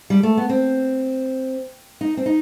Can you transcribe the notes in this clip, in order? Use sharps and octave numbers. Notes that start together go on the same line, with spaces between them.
G3
A3
B3
C4
D#4
C4
D#4